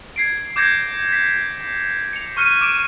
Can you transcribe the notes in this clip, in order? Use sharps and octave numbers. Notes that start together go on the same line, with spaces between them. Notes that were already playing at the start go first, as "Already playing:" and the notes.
G#6 C7 D7
D6 G6 G#6 A#6 C#7
B6
C#7 F7
C#6 F6 F#6 C#7 D#7
D6 D7